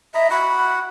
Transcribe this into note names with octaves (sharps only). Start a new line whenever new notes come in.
D#5 E5 A#5 B5
F#4 F#5 B5